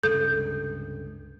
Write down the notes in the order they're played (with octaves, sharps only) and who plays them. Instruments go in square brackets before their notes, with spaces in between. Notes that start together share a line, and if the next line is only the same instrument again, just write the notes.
[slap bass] C#2 G2 C3 [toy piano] A4 [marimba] G6